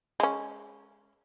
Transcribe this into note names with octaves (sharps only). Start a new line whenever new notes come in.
G#3 C#4